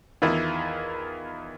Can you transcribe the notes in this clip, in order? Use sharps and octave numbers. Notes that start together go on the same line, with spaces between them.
E2 D#3 E4 F4